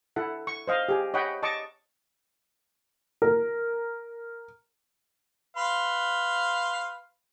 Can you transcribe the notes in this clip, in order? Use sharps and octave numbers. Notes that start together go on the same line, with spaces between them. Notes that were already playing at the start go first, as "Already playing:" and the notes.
E4 A4 F#5
C#6
C5 D#5 F5
G4 G#4
C#5 D#5 F#5 G5 B5
D#5 A5 C#6 D6
A#4
B4 F5 C6